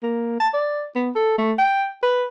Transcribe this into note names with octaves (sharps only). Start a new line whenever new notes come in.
A#3
A5
D5
B3
A4
A3
G5
B4